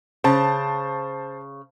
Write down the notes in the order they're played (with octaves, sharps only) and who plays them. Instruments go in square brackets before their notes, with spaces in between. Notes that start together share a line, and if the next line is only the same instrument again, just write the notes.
[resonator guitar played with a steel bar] C#3 [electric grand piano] C5 A5